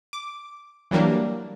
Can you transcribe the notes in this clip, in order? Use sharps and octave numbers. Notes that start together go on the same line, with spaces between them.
D6
E3 F#3 G3 A#3 D4